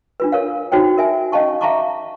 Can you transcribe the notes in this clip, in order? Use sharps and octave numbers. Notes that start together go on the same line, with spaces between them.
D4 F4 B4
A4 A#4 C#5 F5
D#4 F#4 C5 C#5 G5
A#4 E5 G#5
C#4 D#5 F5 A5 C#6
E5 F5 A5 A#5 C#6 D6